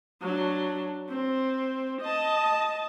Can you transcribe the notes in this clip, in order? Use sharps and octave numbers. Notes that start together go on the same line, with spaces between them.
F#3 D4
C4
D#5 A5